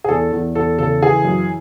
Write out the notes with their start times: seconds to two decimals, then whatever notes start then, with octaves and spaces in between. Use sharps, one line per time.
0.04 G#4
0.09 E2 A4
0.32 E2
0.55 E2 A4
0.79 C#3 A4
1.02 E3 G#4
1.25 F#2